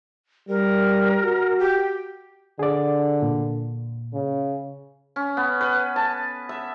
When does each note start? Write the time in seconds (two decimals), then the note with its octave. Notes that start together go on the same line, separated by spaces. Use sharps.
0.49 G3 A#4
1.24 F#4
1.59 G4
2.59 D3 G#4 D5
3.22 A#2
4.13 C#3
5.16 C#4
5.37 B3
5.61 B4
5.96 A5
6.49 E5